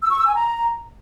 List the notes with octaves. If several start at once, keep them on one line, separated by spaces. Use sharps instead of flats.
E6
C#6
E6
G#5
A#5